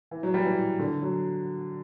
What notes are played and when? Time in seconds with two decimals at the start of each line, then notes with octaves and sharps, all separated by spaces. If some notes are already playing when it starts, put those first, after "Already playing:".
0.11 E3
0.23 F#3
0.34 G3
0.45 E3
0.79 D3
1.02 F#3